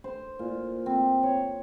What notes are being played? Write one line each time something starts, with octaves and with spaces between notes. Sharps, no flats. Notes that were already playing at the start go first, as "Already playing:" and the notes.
C5
A#2
C4
C#5